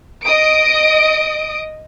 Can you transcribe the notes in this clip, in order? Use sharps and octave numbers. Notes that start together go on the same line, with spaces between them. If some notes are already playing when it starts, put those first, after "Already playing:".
D#5 D#6 D7